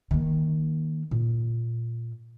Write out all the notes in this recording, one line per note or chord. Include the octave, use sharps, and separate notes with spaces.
D#3 A#3
A#2